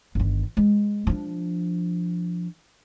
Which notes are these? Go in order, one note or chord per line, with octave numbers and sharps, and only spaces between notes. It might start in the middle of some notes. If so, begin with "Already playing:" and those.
G1 D#3
G#3
F3 D4